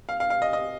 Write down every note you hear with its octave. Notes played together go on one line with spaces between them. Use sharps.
F5
F5
F5
D#5
D#5